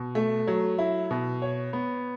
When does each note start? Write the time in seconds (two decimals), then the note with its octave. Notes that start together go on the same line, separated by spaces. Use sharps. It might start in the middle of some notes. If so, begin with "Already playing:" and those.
Already playing: B2
0.15 A3
0.47 F#3
0.78 E4
1.11 B2
1.42 C#5
1.73 B3